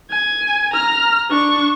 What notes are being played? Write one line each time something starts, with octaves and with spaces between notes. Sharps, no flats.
G#5
A#5 F6
D4 C#6